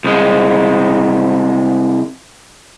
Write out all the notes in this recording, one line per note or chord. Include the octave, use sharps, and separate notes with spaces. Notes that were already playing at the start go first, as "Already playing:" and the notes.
C2 G#3